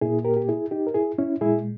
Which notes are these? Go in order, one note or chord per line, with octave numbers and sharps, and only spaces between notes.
A#2 A#3 E4 G#4
G4 A#4
G4
E4 G#4
D#4 G4
A#4
E4 G#4
C#4 E4
A#2 G#3 E4 G#4